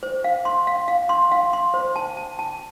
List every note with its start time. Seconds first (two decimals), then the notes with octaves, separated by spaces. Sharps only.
0.03 C5
0.24 F5
0.45 C6
0.67 F5
0.88 F5
1.09 C6
1.32 F5
1.53 C6
1.74 C5
1.96 A5
2.17 A5
2.39 A5